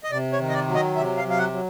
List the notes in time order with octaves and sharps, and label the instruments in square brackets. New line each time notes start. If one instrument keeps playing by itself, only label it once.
[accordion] D#5
C3 D5
C#5
D#3
D#5
D5
F#3
D#5
C3 E5
F5
F#3
F5
F#5
F#3